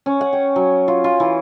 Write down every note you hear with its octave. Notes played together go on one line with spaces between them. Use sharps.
C#4
F#5
G5
F#3
F4
F4
E3